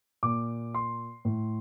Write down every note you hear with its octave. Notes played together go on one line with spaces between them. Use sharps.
A#2 D6
C6
A2